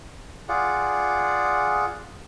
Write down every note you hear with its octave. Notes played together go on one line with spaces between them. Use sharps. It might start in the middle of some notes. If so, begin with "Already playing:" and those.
F4 G#4 D5 F#5